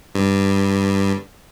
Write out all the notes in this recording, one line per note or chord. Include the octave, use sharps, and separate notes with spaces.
G2